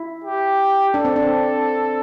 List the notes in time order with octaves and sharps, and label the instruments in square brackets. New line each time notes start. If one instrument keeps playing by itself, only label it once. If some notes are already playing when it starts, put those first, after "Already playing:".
Already playing: [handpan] E4
[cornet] G4
[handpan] D4 [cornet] A4
[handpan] C4
D4